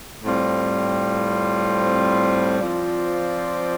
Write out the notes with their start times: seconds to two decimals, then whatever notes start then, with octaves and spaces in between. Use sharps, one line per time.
0.23 A2 G3 C4 F4
2.60 F3 C4 F4 D5